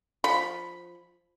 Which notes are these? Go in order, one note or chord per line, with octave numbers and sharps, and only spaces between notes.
F3 B5